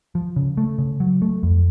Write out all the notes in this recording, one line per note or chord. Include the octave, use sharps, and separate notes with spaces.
F3
C#3
A3
C#3
F#3
A3
F2